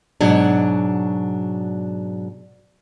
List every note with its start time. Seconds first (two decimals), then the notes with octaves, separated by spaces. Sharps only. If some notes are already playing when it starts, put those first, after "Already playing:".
0.21 G#2 B2 F#3 D4